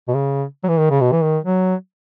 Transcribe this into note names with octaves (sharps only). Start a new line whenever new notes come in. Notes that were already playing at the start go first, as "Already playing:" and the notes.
B2
C#3
F#3
E3
D#3
C#3
B2
E3
D#3
F#3